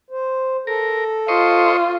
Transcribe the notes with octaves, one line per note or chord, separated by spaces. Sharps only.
C5
A4 A#4
F4 C5 D#5 C#6